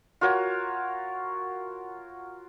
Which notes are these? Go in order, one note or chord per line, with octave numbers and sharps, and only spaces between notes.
F4 F#4 A#4 C#5